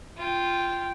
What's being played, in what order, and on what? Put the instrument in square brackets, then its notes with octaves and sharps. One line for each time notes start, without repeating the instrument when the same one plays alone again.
[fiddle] F4 G5